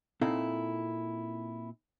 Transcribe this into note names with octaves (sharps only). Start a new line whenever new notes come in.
A#2 C4 D#4 E4 A4 F5